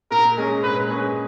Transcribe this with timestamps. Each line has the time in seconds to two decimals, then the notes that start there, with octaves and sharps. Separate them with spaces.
0.11 A#2 A#4
0.37 G#3 C#4 G#4
0.63 A#2 B4
0.90 G#3 C#4 G#4